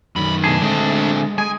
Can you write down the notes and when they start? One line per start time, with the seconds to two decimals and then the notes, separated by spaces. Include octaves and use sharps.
0.16 F#2 D#3 G#3 B5
0.44 B2 A3 D4 G#4
0.62 D3 G#3 C4
1.38 G#3 G#4 G#5